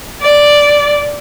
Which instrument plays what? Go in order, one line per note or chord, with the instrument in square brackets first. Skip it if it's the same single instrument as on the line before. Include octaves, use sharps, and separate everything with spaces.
[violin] D5